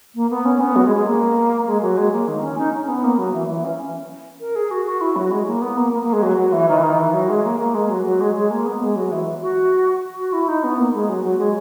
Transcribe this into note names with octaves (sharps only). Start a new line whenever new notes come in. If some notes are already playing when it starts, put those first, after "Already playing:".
A#3
B3
C#4
B3
F#3
G#3
G#3
A#3
G#3
F#3
G#3
A#3
D#3
C#4
D#4
C#4
B3
A#3
F#3
E3
E3
C#4
A#4
G#4
F#4
F#4
E4
F#3
G#3
A#3
B3
A#3
A#3
A#3
G#3
F#3
F#3
E3
D#3
E3
D#3
E3
F#3
G#3
A#3
A#3
G#3
F#3
F#3
G#3
G#3
A#3
B3
G#3
F#3
E3
F#4
F#4
E4
D#4
B3
A#3
G#3
F#3
F#3
G#3